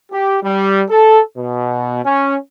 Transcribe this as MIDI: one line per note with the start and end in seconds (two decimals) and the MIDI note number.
0.13 0.38 67
0.43 0.83 55
0.89 1.19 69
1.37 2.01 47
2.05 2.35 61